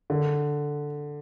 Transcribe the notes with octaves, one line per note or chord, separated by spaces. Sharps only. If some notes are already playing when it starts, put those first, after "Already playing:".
D3